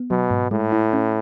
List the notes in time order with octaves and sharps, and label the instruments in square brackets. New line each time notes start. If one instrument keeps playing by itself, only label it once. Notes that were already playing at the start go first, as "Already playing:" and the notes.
Already playing: [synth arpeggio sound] B3
[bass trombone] B2 [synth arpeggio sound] F#3
[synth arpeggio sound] G#2
[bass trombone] A2 [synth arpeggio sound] G#3
[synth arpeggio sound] E4
C#4